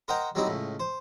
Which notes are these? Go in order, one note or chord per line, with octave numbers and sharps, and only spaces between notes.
A#4 C5 D#5 F#5 G5 A#5
F#3 G3 C4 D#4 E4 G4
C#2 A2
C5